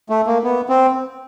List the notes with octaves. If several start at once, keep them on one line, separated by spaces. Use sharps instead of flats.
A3
A#3
B3
C4